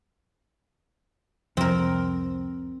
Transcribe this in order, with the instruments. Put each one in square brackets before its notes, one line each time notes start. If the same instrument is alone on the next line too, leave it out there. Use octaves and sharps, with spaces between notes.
[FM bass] C2 [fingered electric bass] F2 [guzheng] C4 A#4